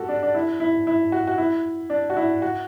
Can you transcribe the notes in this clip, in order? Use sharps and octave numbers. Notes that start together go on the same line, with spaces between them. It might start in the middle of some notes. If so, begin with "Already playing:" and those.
Already playing: F#4 G4 A4
D4
D4
E4
E4
E4
F#4
F#4
E4
D4
F#4
E4
F#4